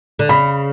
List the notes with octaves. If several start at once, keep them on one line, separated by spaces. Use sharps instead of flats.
D3
C#3 B5